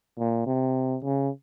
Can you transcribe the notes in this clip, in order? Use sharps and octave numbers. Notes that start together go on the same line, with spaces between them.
A#2
C3
C#3